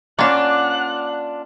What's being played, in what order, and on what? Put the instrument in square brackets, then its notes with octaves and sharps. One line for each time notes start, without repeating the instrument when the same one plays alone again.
[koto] A#3 C#4 [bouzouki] D4 F4 [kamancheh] F#5 F#6